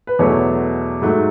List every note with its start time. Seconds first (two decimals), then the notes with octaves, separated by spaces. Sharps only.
0.07 B4
0.19 E2 B2 F#3 A3 C#5
1.02 G#2 F#3 A3